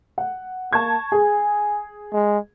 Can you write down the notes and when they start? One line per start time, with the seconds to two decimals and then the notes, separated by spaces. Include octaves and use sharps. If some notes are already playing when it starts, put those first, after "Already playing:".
0.18 F#5
0.73 A#3 A5 C#6 G#6
1.12 G#4 G#5
2.12 G#3